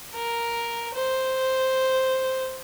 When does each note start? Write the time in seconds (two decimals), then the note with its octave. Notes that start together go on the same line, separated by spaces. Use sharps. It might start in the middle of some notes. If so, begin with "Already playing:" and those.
0.14 A#4
0.95 C5